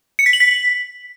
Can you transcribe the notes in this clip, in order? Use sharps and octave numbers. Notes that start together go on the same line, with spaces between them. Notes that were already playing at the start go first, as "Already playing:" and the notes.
C#7
B6
F#7
B6